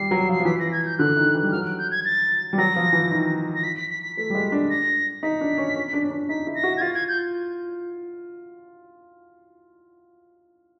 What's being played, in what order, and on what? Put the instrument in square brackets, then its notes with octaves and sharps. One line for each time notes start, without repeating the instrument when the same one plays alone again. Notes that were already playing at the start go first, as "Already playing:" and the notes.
Already playing: [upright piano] G3 [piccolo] C7
[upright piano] F#3
F3
[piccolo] C7
[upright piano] F3
[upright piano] E3 [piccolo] B6
[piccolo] A#6
G#6
G6
[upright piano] D3 [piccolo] F#6
[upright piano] D#3
E3
G3
[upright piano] F#3 [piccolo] F6
[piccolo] F#6
G6
G#6
A6
[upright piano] G3
[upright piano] F#3 [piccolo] A#6
[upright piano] F3
E3
D#3
[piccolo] A#6
B6
B6
B6
B6
[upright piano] A3 [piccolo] B6
[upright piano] G3
G#3
D4
[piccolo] A#6
[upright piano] D#4 [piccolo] B6
[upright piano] D4
C#4
C#4
D4
C#4
D4
[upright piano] D#4 [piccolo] B6
[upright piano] E4
[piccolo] A#6
[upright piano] F#4
[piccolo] G#6
[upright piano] F4 [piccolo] A6
[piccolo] G#6
G6